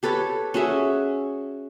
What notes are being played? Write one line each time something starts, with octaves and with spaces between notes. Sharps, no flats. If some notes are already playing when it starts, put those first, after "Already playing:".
G4 A4 B4 C#5
C#4 F#4 G#4 E5